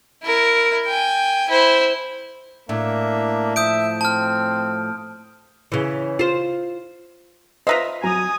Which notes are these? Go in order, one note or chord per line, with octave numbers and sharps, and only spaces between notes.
E4 A#4
G5 G#5
E4 C5
A2 A#3 D4 E5
F3 E5 D#6 G6 D7
C4 A5 F6
C#3 E3
F4 C5
F4 B4 C5 D#5 E5 A#5
F#3 G#5 A#5 D#6